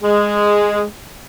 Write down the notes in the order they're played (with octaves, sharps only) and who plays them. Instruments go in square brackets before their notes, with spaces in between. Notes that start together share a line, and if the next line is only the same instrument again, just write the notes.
[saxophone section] G#3